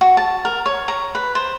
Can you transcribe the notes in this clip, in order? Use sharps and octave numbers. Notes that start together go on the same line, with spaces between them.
F#4
A5
A#4
C#5
A#5
B4
C5